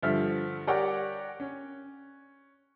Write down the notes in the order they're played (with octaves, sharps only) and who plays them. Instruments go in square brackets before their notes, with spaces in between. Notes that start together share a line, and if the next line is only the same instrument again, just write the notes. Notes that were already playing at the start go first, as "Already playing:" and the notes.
[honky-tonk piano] G2 D3 F3 E5 F6
G4 A#4 C#5 D5 F#5 G5
C#4